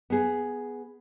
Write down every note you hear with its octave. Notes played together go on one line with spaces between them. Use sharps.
B3 G#4